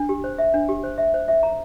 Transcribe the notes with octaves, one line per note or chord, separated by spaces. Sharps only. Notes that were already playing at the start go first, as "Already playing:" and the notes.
Already playing: D4
G4
C5
E5
D4
G4
C5
E5
C5
E5
A#5